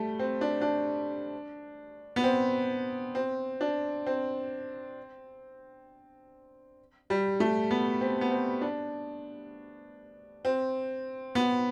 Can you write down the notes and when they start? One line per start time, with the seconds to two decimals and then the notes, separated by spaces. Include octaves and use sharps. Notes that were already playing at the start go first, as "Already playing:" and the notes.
Already playing: G3 A3
0.19 C4
0.41 D4
0.61 D4
2.16 B3
2.23 C4
3.15 C4
3.61 D4
4.06 C4
7.10 G3
7.40 A3
7.71 B3
8.01 C4
8.21 B3
8.31 C4
8.61 D4
10.45 C4
11.35 B3